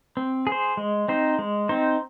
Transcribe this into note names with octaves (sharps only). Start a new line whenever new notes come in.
C4
G#4
C5
G#3
C4 D#4 C5
G#3
C4 D#4 C5